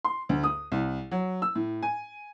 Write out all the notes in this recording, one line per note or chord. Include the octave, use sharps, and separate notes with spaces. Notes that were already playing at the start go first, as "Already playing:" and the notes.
C6
D2
D#6
C2
F#3
E6
A2
G#5